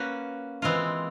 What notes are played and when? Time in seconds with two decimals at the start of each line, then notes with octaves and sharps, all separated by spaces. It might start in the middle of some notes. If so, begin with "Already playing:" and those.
Already playing: A#3 C#4 F#4 B4
0.62 E3 G#3 C4 F4 A#4